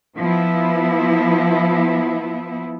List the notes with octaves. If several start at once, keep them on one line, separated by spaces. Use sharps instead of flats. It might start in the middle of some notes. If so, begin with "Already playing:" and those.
F3 B3 E4